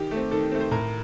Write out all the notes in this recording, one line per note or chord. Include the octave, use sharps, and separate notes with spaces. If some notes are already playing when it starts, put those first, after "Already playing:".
Already playing: D#3 G4
A3
C4
D#3 A4
A3 C4
C5
A2 A#4